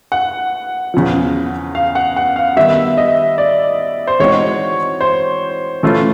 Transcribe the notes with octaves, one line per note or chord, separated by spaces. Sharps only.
F#5
E2 C#3 F3
F5
F#5
F#5
F5
D#3 G3 B3 E5
D#5
D5
C5
E3 G#3 C4 D#4 F#4 C#5
C5
E3 A3 C#4 F4